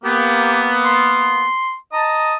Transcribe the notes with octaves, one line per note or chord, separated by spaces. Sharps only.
A#3 B3 G4
C6
D#5 A5 A#5 D#6